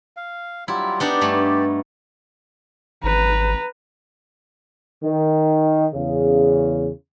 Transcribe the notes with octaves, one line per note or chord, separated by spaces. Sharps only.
F5
F#3 G3 E4 F4
B3 D4 D#4 G4 D5
G2 A3 B5
G#1 B4 A#5
D#3
E2 C#3